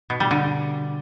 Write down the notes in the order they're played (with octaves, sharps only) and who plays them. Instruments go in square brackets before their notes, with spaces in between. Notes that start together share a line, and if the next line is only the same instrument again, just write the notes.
[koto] B2
G3
D3